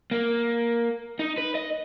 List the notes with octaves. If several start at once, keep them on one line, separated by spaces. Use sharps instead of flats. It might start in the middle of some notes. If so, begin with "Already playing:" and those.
A#3
D#4
B4
D#5